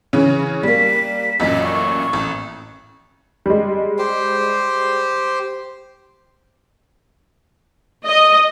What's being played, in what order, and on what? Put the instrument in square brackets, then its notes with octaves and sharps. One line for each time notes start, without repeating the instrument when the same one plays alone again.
[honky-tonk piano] C#3 E3 C#4
[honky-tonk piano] G3 A#3 [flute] B6
[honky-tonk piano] A1 F#2 A#2 [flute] D#5
[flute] C#6
[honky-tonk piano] A1
G3 G#3
[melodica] G4 C5
[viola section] D#5